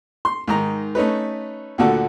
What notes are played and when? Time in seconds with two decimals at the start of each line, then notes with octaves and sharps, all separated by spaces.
0.25 C6
0.48 G#2 D#3 A#5
0.95 A3 C#4 D#4 B4
1.78 D2 A#2 D3 F#4 A4 F#5